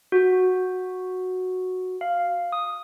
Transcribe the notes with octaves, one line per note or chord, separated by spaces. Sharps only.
F#4
F5
D#6